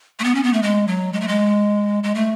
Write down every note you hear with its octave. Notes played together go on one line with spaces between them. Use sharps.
A3
B3
C#4
B3
A3
G#3
F#3
G#3
A3
G#3
G#3
A3